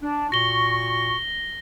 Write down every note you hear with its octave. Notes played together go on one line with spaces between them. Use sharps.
D4
A#2 F#4 C#6 A#6 G7